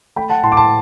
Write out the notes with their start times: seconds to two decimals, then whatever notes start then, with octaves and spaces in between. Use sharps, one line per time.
0.16 A3 G5 B5
0.30 F#5 A5
0.43 A2 A5 C6
0.52 D6
0.57 A5 C6